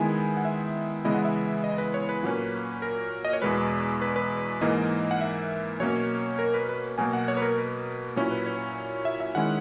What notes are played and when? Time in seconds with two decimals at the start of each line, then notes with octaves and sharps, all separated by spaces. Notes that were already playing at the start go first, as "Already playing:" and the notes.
Already playing: D#3 G#3 B3 E4 G#5
0.37 F#5
0.45 E5
1.04 C#3 E3 G#3 B3 E4 D#5
1.14 F#5
1.25 E5
1.64 D#5
1.78 B4
1.94 C#5
2.09 B4
2.23 A#2 F#3 A#3 C#4
2.82 A#4
3.25 D#5
3.33 C#5
3.42 E2 B2 G#3 B4
4.02 B4
4.16 B4
4.61 G#2 E3 A#3 D#5
5.11 F#5
5.21 E5
5.80 B2 F#3 A#3 C#4 C#5
6.39 A#4
6.54 B4
6.69 B4
6.98 B2 F#3 A#3 G#5
7.13 F#5
7.28 C#5
7.37 B4
7.42 A#4
7.58 B4
8.16 A#2 F#3 C#4 E4 C#5
8.31 B4
8.46 C#5
9.05 E5
9.21 E5
9.35 D#3 G#3 C#4 E4 F#5